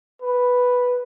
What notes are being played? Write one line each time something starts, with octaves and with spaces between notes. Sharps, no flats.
B4